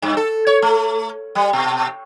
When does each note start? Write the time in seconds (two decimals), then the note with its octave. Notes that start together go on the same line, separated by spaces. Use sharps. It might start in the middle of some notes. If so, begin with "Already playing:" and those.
0.02 G2
0.17 A4
0.47 C#5
0.62 A3
1.35 G3
1.53 B2